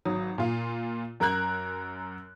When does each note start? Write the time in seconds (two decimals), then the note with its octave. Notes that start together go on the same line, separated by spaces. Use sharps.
0.05 G#1 F#3 D#6
0.38 A#2 F4
1.20 F#2 A#4 A#5 F#6 G#6